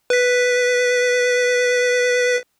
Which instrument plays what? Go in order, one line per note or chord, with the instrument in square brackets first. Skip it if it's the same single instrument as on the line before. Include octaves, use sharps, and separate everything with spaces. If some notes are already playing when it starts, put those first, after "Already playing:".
[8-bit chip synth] B4 B6